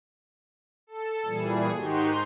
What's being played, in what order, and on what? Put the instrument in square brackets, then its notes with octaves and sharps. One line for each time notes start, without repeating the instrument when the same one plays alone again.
[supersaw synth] A4
[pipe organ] A#2 E3 G3 [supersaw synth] G#4
[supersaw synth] G#2 D#4 C6 [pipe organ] D#3 F#4 G4